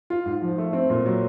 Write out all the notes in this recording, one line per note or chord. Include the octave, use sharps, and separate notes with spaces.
F4
G#2
F3
A3
C4
A#2
F#3